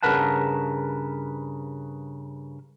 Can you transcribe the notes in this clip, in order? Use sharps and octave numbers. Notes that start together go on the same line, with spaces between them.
G2 C#3 A#4 B4 F#5 A5